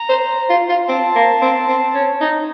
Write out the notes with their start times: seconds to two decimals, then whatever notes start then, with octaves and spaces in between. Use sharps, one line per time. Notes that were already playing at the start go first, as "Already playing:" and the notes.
Already playing: A#5
0.09 C5
0.50 F4
0.69 F4
0.89 C4 A5
1.15 A#3
1.42 C4
1.68 C4
1.95 C#4
2.21 D#4